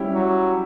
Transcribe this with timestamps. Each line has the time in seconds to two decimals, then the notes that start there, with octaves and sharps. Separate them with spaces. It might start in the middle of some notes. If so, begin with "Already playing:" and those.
Already playing: G3 C#4 E4 G4
0.14 F#3